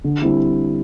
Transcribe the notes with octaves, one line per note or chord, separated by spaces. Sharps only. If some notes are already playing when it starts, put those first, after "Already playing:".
D3
G3 C4 E4